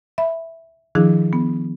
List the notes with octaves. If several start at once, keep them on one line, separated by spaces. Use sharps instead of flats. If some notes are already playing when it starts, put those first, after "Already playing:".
E5 B5
D#3 F3 D4 E4 G#4
B3